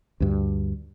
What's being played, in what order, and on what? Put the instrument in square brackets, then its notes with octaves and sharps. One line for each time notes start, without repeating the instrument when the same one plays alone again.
[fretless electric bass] D2 G2